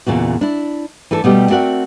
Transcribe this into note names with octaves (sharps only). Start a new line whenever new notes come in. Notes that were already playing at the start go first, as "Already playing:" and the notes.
E2 A#2 C#3 F#4
D4 E4
E3 A3 D4 A4
B2 G3 A3 B3 G4
A3 C4 F#4 A#4 D5 F#5